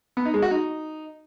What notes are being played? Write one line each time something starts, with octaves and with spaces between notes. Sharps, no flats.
B3
D#4
G#3
F#4
D#4